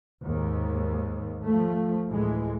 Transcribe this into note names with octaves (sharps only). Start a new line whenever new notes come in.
D#2 G#2
F3 A3
D2 A2 E3 G#3